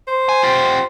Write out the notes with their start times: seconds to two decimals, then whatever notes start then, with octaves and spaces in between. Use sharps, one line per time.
0.07 C5
0.29 G#5
0.43 F4 G4